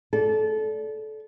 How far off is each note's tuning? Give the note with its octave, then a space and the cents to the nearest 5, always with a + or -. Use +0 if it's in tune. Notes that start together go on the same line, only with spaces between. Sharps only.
A4 -25 D5 -20